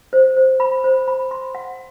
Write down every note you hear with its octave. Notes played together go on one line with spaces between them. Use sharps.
C5
C5
B5
C5
B5
C6
F#5